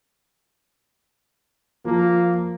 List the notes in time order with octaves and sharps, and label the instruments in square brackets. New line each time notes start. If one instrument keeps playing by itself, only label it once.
[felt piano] F3 [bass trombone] A#3